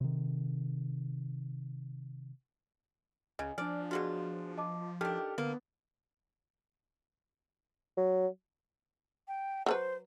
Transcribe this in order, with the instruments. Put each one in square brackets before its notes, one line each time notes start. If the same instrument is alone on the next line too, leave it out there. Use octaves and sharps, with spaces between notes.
[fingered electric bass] C3 D#3
[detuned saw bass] C#2 [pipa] C#3 [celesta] D#5 G#5
[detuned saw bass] F3 [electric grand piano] D4 G#5 [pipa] D5 [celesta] F6
[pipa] B2 F#3 F4 [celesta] F#4 G#4
[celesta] D#5 A5 D6
[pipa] D#3 D4 [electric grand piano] G4 A4 [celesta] F6
[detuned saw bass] D3 [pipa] A#3 [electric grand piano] B3
[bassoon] F#3
[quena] G5
[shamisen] F#3 A4 B4 [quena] C5